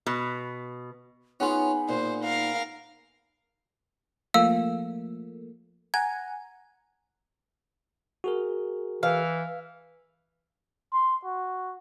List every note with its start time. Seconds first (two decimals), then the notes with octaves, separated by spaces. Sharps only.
0.07 B2
1.40 B3 C#4 D#4 F4 G#4 F#5
1.89 A#2 C5
2.24 A#4 F5
4.34 F3 A3 A#3 F5 E6
5.94 F#5 G#5 A#5 G#6
8.24 F#4 G#4 A#4
9.03 E3 F5
10.93 C6
11.25 F#4